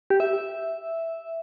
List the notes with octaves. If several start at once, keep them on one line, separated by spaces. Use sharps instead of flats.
G4
E5